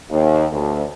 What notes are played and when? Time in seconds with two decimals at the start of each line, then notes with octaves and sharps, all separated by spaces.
0.11 D#2
0.53 D2